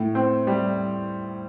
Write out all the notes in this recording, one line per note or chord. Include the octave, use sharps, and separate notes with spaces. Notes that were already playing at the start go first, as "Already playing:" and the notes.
Already playing: A2
C4
G3